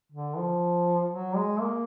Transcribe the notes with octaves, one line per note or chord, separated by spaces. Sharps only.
D3
F3
F#3
G#3
A#3